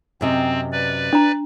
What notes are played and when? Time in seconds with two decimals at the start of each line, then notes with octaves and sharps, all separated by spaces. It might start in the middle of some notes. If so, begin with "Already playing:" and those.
0.21 F#2 C3 C4 D#5
0.72 B4 D5
1.13 D4 A#5